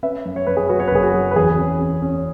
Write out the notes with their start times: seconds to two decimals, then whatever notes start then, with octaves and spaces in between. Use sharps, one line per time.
0.03 C#4 B4 E5
0.25 F#2
0.36 C#5
0.47 F#2 B4
0.57 G#4 C#5
0.69 F#3 F#4 B4
0.80 C#5
0.87 B4
0.91 F#1 G#4
1.03 F#4
1.14 F#3
1.31 B4
1.36 E2 G#4
1.58 C#4
1.80 C#4
2.02 C#4